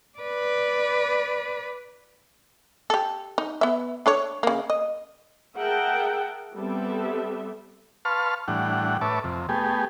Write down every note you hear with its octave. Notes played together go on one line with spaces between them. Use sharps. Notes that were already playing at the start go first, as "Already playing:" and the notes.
B4 D5
G4 A4
D#4
B3 E5
D4 A4 C#5
C#3 A#3
D#5
G#4 A#4 E5 F#5 G5 A5
G3 B3 C4 A4 E5
B4 F5 A5 C6 C#6 F6
A2 E3 G3 D4 F#5
A2 B4 C#5 E5 A5 D6
F2 C3
A3 B3 G4 G#4